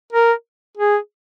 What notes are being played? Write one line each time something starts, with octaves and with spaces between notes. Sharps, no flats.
A#4
G#4